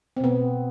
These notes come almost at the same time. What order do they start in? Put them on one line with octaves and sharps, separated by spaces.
C4 B2 B3